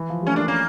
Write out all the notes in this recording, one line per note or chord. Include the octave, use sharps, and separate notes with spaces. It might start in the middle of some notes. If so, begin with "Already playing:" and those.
Already playing: E3
F3
G3
A3 C#4
A#3 D4
A#3 C#4